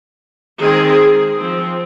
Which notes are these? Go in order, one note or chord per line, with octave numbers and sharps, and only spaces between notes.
D#3 G#3 C4 G#4
F3 C4